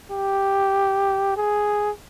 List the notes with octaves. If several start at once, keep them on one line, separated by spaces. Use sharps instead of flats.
G4
G#4